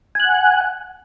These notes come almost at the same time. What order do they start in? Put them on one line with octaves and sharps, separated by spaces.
G#5 F#6 F#5